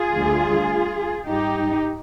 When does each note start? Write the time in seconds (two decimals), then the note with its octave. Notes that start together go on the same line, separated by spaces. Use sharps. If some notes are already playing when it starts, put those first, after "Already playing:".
Already playing: F4 G#4
0.14 D2 D3 G3
1.25 G#2 G3 D#4 G4